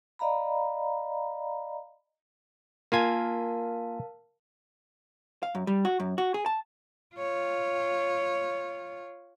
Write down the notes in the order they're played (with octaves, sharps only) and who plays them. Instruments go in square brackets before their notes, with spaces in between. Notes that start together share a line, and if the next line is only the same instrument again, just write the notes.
[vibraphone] D5 D#5 F5 A#5 B5
[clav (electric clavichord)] A#3 F4 G#5 [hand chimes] A#4 F5 A5
[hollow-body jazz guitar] F5
F#2
G3
F#4
F#2
F#4
G#4
A5
[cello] F4 C#5